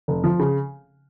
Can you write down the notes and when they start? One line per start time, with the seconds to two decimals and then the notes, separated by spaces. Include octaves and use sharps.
0.08 F1
0.24 F3
0.39 C#3